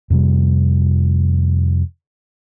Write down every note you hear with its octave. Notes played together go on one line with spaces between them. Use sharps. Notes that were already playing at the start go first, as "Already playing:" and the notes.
F2 C3 G3